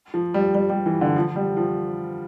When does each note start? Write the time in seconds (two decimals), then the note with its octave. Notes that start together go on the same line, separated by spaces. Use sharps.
0.14 F3
0.34 G3
0.55 G3
0.70 G3
0.86 E3
1.01 D3
1.16 F3
1.36 G3
1.57 F3